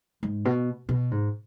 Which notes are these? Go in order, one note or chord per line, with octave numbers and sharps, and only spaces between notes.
G#2
B2
B2
G#2